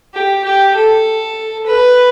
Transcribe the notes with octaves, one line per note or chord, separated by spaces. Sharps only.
G4
G4
A4
B4